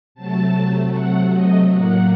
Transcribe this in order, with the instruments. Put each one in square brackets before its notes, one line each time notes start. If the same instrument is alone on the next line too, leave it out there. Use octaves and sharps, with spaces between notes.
[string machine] C3 F#3 A3 A5
F#5
D#5
A2 F#3 A#3 F#5